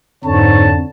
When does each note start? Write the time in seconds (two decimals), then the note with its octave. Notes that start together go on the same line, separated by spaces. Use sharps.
0.24 F2 G#2 D3 C#5 A5